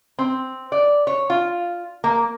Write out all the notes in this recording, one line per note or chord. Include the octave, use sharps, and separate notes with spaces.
C4
D5
C#5
F4
A#3